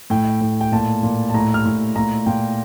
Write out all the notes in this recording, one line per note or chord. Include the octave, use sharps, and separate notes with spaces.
A2 G5
A2
G5
A#2 A5
A#2
A5
A2 A#5
F6
A2
A#2 A#5
A#2 G5